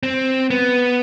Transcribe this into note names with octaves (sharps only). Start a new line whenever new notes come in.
C4
B3